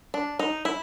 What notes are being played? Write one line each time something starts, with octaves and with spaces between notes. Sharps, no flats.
D4
D#4
E4